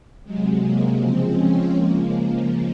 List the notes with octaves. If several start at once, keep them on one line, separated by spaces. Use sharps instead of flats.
C3 F#3 G#3
A#3
C#3 F3 G#3 C4
C#4
C#3 F3 G#3 A#3